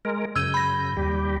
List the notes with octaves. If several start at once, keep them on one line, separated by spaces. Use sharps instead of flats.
G#3 A#4
F#2 C#3 E6 G6 G#6 D#7
B5 A#6
D#2 G3 G4